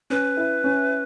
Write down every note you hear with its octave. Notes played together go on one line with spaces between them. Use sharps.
C#4 B4
E4
C#4